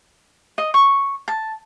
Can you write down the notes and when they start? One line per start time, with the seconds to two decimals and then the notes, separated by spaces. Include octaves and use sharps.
0.58 D#5
0.74 C#6
1.28 A5